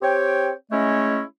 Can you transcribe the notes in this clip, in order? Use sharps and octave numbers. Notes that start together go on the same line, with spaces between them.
C4 G4 C#5 G5
G#3 A3 C#4 E4 C#5 D#5